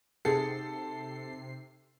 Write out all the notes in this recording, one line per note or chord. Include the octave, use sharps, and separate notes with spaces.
C3 D#4 G#4 A4 F#5 C7